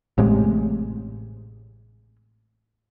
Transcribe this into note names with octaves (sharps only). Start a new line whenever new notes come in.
A1 A2 C3 G#3